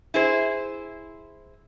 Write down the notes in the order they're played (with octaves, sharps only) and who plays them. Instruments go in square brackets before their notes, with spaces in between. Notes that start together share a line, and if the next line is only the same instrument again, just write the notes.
[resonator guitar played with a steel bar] E4 G#4 C5